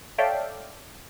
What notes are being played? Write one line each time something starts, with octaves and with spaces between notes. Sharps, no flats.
A4 C#5 D5 E5 F5 G5